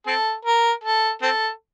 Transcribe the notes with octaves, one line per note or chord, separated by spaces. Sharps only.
C4 A4
A#4
A4
C4 A4